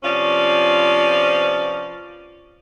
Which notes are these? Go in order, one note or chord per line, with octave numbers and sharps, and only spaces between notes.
C3 F3 B3 C#4 D5 F5